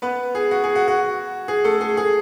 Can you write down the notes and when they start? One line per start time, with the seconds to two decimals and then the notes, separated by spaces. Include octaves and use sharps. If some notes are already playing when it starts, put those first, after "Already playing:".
0.02 B3 B4
0.35 G#4
0.51 F#4
0.64 G#4
0.75 F#4
0.88 F#4
1.48 G#4
1.64 A3 A4
1.81 G#4
1.97 G#4